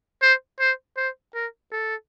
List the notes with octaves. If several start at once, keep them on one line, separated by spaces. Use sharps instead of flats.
C5
C5
C5
A#4
A4